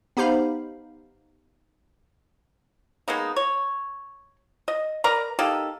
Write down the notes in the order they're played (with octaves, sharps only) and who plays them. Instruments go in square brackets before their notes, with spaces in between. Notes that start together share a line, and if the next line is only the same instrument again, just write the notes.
[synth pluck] B3 D#4 G4 C5 F5 B5
[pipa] G#3 A#3 B3 D#4
C#5
D#5
A#4 B4 D5 A#5
A#3 D#4 G4 A4